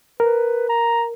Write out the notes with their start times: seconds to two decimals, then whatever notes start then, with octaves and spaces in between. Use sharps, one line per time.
0.20 A#4 B4
0.69 A#5